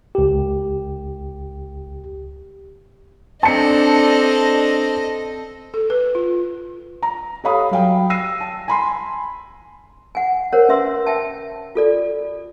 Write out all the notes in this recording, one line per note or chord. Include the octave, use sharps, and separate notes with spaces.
C#2 G4
C4 D4 A4 D#5 A5 C#7
A4
B4
F4
A#5
G4 A4 C#5 F5 B5 D#6
F#3 F5 G5
E6 A#6 C7 D#7
A5
G#5 B5 C6
F#5 G#5
A#4 C5 C#5 F#5
C#4 B4 E5 C6 E6
E5 G5 A5
F4 A4 D5